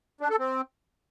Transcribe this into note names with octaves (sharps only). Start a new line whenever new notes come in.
D4
A4
C4